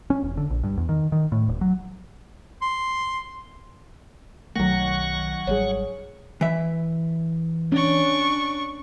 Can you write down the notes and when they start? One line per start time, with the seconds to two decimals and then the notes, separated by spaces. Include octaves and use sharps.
0.10 C#4
0.22 E1
0.37 D3
0.50 A#1
0.64 G2
0.77 E2
0.89 D#3
1.12 D#3
1.32 A2
1.48 D#1
1.61 F#3
2.62 C6
4.56 B1 D#3 F#3 A3 F#5 C#6 A#6
5.47 G#1 G3 G#4 C#5
6.41 E3 E5
7.72 C#4 D4 C#6